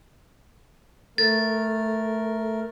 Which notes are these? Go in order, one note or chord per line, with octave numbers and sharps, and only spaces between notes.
A3 A4 A#4 A6